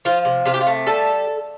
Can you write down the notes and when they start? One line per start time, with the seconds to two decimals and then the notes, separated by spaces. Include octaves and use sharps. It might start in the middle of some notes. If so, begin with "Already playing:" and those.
0.05 F3 F4
0.25 C3
0.45 C3 F4
0.54 G4
0.61 F4
0.67 A3
0.86 G3 A4